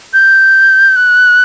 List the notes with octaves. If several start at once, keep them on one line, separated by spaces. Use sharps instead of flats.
G6
F#6